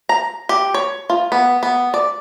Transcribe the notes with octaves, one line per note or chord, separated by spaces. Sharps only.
A#5
G4
C#5
F4
B3
B3
D5